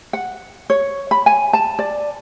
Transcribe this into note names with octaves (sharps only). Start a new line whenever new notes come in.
F#5
C#5
B5
G#5
A5
D5